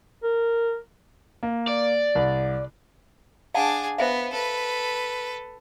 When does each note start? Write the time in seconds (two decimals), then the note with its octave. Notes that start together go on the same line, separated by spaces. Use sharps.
0.23 A#4
1.43 A#3
1.68 D5
2.15 C2
3.55 D4 G#4 F5 F#5 A5
3.98 B3 C5 E5 F5
4.31 A4 B4